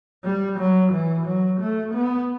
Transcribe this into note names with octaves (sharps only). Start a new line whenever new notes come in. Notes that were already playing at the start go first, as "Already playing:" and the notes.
G3
F#3
E3
F#3
A3
B3